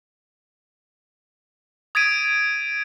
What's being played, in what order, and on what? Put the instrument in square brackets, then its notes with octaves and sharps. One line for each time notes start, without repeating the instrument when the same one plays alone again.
[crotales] D#6 G#6 A6 B6 D7 D#7